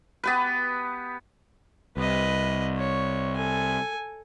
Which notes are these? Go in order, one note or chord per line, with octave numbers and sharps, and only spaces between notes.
B3 G4 B4
C2 B4 D#5
C#5
A4 G#5